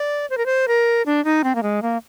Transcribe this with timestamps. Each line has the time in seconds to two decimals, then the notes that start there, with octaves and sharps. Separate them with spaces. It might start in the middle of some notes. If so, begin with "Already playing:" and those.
Already playing: D5
0.30 C5
0.38 A#4
0.46 C5
0.68 A#4
1.06 D4
1.25 D#4
1.44 C4
1.55 A#3
1.63 G#3
1.82 A#3